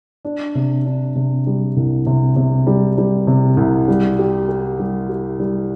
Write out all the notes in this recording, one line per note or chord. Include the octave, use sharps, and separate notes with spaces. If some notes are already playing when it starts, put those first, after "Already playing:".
D4
C3
D4
C3
G3
C2
C3
C3
G3
G3
C3
C2
G3
G4
G4
G3
G4
G3